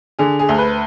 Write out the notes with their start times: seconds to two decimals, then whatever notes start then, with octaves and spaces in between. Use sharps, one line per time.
0.19 D3 G#4
0.39 G#4
0.49 D2
0.59 B4